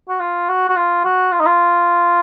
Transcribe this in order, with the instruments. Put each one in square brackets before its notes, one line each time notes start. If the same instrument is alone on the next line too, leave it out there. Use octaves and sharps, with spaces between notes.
[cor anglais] F#4
F4
F#4
F#4
F4
F#4
F4
D#4
F4